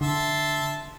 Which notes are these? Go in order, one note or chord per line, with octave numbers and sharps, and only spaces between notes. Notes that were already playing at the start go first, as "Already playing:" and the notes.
D3 E5 A5 C6